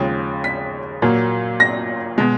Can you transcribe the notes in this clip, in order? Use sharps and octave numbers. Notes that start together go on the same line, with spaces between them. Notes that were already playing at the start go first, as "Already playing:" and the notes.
Already playing: D#2 C#3 F3 G#3
B6
A#2 F#3 A#3
A#6
B2 G#3